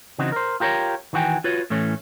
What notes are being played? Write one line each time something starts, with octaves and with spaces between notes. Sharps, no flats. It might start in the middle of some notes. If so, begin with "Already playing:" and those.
C#3 E3 C4 D#4 F#4
A#4 C5
F4 G4 A#4 C5 C#5
D#3 E3 F#4 G5 G#5
F4 F#4 B4 C#5
A2 E3 A3 C#4